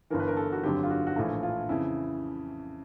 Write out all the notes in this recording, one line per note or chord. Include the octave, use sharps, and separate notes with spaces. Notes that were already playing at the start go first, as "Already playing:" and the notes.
G1 G2 E3 A#4
B4
A#4
A4
F#4
G1 F2 D3 F#3 G4
F4
F#4
F#4
A#1 A2 E3 A3 F4
F4
F2 C#3 E3 E4